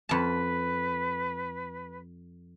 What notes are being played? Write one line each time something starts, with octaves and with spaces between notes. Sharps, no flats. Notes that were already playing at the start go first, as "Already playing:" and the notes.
F2 B4 A5